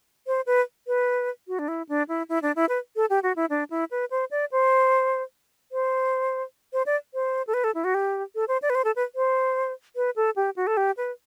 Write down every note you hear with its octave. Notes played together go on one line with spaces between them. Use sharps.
C5
B4
B4
F#4
D4
E4
D4
E4
E4
D4
E4
B4
A4
G4
F#4
E4
D4
E4
B4
C5
D5
C5
C5
C5
D5
C5
A4
B4
A4
E4
F#4
G4
A4
C5
D5
B4
C5
A4
B4
C5
B4
A4
G4
F#4
A4
G4
B4